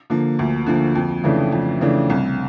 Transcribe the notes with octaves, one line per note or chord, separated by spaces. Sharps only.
D3 F3 A#3
D2
D3 F3 A#3
F2
C#3 E3 A3 D4
F2
C#3 E3 A3 D4
C2